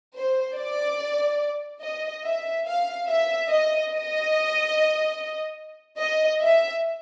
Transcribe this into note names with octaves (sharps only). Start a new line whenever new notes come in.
C5
D5
D#5
E5
F5
E5
D#5
D#5
D#5
E5